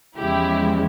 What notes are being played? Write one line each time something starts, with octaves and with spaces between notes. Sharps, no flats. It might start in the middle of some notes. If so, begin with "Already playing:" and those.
E2 C#3 F3 G#3 E4 G4